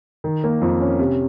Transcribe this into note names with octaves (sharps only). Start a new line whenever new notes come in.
D#3
A#3
F2
C#4
C3